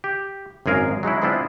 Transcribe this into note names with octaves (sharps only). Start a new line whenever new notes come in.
G4
G#1 F#2 G#4 A#4 F5
F#3 G#3 D#4 E4
G#3 B3 C4 D4 E4 F4